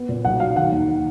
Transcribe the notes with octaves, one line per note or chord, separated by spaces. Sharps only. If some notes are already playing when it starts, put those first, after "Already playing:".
Already playing: B3
A#2
B1 F#5
F#3 F5
D#3 F#5
D#2